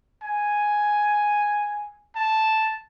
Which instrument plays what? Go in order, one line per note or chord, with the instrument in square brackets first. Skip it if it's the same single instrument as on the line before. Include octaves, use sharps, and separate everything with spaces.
[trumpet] G#5
A5